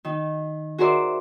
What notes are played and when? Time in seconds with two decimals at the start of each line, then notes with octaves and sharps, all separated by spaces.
0.05 D#3 D#4
0.78 F#4 G#4 A#4 C5 D5 E5